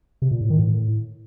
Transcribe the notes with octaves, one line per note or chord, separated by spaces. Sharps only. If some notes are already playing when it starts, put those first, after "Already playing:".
C3
A#2
A2
D#3
A2